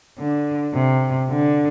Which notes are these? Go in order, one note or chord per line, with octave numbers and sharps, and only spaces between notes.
D3
C3
D3